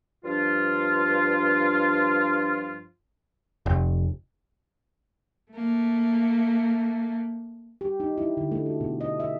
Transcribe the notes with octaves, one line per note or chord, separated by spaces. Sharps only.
G2 F3 D4 F4
F1
A3 A#3
G4
D#4
E4
D3
A3
F#4
B2
D#5
E5